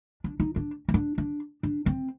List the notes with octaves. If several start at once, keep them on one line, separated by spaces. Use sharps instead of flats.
D4
D#4
D4
C#4
D4
D4
D4
C4